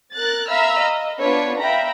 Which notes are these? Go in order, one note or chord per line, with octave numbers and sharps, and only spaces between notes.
A#4 F#6 A6
E5 F5 A#5 B5 E6 F6
D#5
B3 D4 F4 B4 C#5
E5 F5 G5 A#5 B5